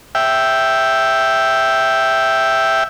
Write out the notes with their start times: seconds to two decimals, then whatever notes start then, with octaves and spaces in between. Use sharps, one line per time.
0.15 E5 G5